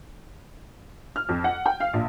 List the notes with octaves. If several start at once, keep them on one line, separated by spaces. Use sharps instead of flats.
F6
F2
F#5
G5
F5
A#1